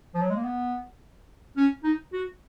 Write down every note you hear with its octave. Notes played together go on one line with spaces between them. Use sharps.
F3
F#3
G#3
A#3
B3
C#4
D#4
F#4